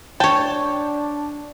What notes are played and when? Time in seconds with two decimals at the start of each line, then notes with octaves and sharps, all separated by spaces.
0.20 D4 C#5 G5 A5